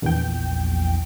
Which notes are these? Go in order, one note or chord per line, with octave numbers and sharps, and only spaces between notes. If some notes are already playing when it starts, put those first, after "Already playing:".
A#1 E2 G5